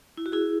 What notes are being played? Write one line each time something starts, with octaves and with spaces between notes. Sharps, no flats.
E4
F#4
E4 G#4